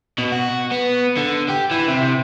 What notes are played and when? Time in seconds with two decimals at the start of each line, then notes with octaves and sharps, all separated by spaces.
0.19 B2
0.32 F#4
0.71 B3
1.17 D3
1.49 G4
1.71 E3
1.88 C3